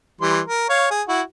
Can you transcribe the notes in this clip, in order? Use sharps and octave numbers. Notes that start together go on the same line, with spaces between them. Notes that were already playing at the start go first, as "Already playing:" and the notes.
E3 G3 C6
A#4
C#5 F5
G#4
E4 F#4